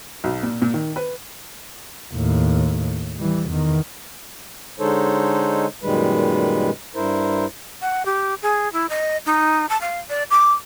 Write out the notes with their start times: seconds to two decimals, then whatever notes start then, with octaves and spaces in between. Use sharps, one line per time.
0.24 B1
0.43 A#2
0.62 A#2
0.74 D#3
0.96 B4
2.14 D#2 A2
3.16 E3 G3
3.49 E2 D#3
4.80 D3 G#3 D#4 A4 C5 C#5
5.83 F#2 A#2 D#3 G3 G#3 B4
6.96 G2 E4 A#4 C5
7.82 F#5
8.05 G4
8.42 G#4
8.73 E4
8.89 D#5
9.26 D#4
9.69 A5
9.81 F5
10.10 D5
10.30 D6